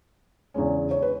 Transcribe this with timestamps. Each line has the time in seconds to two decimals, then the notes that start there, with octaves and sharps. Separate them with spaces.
0.54 E2 C#3 G#3 C#4
0.91 C#5
1.02 B4